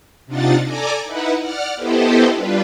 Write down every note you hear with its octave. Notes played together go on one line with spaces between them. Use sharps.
C3 D4 D#4 F4 F#5 A6
A4 D5 G#5 A#5 D6
D#4 E4 B4 F#5
D5 F#5 F6
B3 E4 G4 A4 C5 D#5
G3 D4 F4 B4